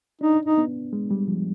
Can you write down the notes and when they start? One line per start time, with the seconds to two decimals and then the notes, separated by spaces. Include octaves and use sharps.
0.21 D4 D#4
0.45 D#4
0.58 B3
0.93 G#3
1.11 G3
1.28 F3